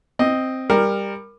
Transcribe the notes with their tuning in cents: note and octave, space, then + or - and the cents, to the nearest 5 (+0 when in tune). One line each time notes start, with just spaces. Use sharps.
C4 +0 D#5 +0
G3 +20 A#4 +0